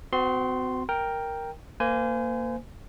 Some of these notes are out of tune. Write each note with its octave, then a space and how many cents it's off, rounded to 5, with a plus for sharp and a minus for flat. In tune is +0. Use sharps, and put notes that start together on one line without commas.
C4 -40 F#4 +0 C6 +0
A#4 +0 G5 +5
A#3 -10 C5 -35 G#5 +0